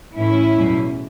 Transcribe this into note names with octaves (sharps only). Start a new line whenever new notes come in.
A2 E3 A3 C#4 E4
E2 B2 F#3 A3